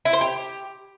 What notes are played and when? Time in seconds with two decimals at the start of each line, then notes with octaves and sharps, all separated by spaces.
0.05 E4
0.13 C5
0.21 G4